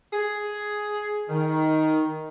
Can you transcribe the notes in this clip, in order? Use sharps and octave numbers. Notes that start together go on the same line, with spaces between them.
G#4
D#3